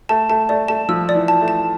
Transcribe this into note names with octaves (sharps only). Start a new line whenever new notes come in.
A3 A5
A3 A5
A3 D5
A3 A5
F3 E6
D5
E3
A5
A3
A5